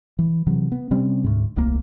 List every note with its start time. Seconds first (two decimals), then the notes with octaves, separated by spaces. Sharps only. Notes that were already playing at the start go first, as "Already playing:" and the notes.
0.19 E3
0.46 C3 E3 F#3
0.72 B3
0.91 C3 G3 C4 C#4
1.24 D2 G#2
1.56 D#1 C2 A3 A#3